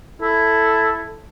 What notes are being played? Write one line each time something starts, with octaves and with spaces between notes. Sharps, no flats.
E4 A4